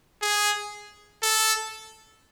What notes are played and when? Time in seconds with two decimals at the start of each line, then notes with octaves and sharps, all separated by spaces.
0.22 G#4
1.23 A4